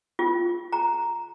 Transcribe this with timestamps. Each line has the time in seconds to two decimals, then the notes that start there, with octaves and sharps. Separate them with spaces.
0.19 F4
0.72 A#5